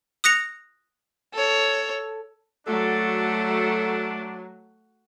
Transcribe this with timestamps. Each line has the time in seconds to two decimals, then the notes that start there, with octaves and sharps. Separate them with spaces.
0.24 D#6 F#6 A#6 C#7 F7
1.33 A4 C#5
2.67 F#3 A3 D4 F#4 A4